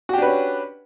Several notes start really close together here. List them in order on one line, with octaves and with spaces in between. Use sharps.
F#4 G4 D4 B4 C#4